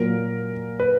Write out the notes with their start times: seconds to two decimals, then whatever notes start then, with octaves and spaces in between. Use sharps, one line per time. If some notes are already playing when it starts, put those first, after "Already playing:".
Already playing: A#2 F#3 A#3 A#4
0.80 B4